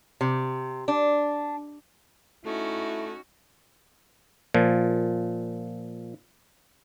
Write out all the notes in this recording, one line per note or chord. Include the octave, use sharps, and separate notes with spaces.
C3
D4
A3 C#4 D#4 E4 F#4
A#2 F3